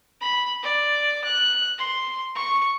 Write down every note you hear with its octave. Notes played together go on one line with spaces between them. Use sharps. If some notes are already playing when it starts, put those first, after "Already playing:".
B5
D5
F#6
C6
C#6